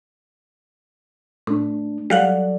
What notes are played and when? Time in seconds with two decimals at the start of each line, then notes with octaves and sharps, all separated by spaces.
1.47 A2 A3 D4
2.10 F#3 G3 A4 D5 F5 F#5